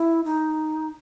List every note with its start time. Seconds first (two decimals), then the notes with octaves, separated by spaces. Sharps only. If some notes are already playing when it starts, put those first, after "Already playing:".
Already playing: E4
0.24 D#4